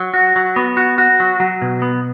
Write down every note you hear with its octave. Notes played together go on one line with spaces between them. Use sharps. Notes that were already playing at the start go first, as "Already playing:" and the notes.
Already playing: F#3
F#4
F#3
B3
F#4
F#4
F#3
F#3
B2
B3